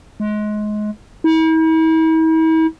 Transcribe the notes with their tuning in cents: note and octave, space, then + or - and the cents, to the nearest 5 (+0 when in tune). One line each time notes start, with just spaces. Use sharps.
G#3 +25
E4 -45